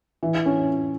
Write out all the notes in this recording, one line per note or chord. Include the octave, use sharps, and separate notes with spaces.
E3
C#4